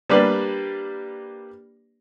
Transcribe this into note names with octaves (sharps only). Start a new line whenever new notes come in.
G3 A#3 D4 G4 B4 D5